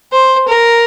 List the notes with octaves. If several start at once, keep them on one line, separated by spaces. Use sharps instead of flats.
C5
A#4